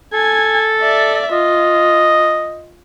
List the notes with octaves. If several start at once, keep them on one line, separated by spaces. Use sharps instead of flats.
A4 G#5 G#6
D5 E5
F4 D#5